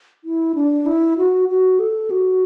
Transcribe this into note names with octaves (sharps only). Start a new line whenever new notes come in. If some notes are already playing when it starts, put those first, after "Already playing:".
E4
D4
E4
F#4
F#4
A4
F#4